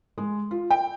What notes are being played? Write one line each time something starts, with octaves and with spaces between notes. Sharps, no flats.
G#3
F4
G5